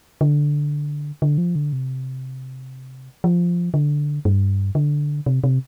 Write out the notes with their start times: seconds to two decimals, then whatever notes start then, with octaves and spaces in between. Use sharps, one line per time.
0.21 D3
1.22 D3
1.38 F3
1.55 D3
1.73 C3
3.24 F3
3.74 D3
4.25 G2
4.75 D3
5.26 C3
5.44 C3